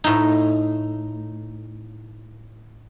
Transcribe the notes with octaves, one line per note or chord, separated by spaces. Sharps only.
A2 D#4